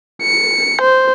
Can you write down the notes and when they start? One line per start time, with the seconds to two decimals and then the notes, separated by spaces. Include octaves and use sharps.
0.22 C#7
0.81 C5